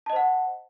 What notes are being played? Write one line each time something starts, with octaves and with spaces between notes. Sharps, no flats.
C5 D#5 F#5 A5